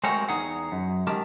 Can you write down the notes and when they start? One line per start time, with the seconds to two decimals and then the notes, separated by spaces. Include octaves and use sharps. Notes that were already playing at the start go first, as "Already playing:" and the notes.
0.04 G#3 A3 C4 F#4 A#4 C#5
0.29 E2 D#4 G#4 F#5
0.72 F#2
1.07 D#3 G#3 G4 A#4 A5